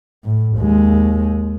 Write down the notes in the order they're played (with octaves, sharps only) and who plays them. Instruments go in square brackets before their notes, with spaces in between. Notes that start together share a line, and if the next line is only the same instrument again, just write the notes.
[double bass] A2
D#2 G#3